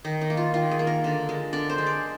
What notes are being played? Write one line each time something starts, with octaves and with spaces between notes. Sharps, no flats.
D#3 D#4
D#4
A#3
F4
D#3 F4
G#4
A#3
A#4
D3
G#3
D3 D5
C5
G#3
D5